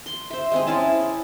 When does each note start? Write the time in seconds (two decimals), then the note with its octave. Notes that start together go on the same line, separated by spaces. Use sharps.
0.06 C6
0.31 C5 E5
0.52 G#3 C4 G#4
0.67 C#4 E4 A5